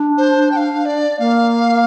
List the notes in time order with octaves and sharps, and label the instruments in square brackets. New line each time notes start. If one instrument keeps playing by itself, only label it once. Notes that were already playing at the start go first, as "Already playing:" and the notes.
Already playing: [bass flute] D4
[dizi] C5
G5
F5
D5
[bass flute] A#3 [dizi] F5